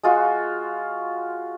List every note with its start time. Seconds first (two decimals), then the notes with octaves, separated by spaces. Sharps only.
0.03 G#3 F4 F#4